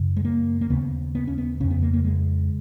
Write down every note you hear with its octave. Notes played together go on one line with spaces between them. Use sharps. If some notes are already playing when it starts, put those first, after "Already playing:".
Already playing: F#2 C#3
G#3
A#3
A#3
D#2 C#3 B3
B3
C#4
B3
F2 C#3 C#4
B3
A#3
A#3
G#3